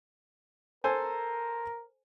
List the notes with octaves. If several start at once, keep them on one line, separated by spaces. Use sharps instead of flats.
A4 A#4 C5 G#5